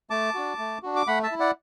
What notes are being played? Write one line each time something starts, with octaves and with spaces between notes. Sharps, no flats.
A3 A5 D6
D4 F#4
A3
D4 F#4
D6
A3 F#5 B5
E5 A5
E4
D5 F#5